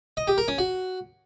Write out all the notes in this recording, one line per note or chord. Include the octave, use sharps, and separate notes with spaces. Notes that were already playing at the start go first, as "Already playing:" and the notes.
D#5
G4
A#4
C#4
F#4